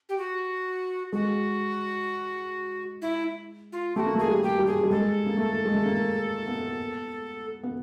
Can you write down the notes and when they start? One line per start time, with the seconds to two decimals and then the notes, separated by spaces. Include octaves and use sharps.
0.09 G4
0.18 F#4
1.12 G#3 F#4
3.02 E4
3.72 F4
3.96 A3 F#4 G4
4.06 A#3
4.15 A3
4.19 G#4
4.27 G3
4.43 G4
4.58 G3
4.66 G#4
4.84 G3
4.90 G#3 A4
5.26 A#3
5.37 A3
5.65 G#3
5.74 A3
5.85 A#3
6.48 B3
7.63 B3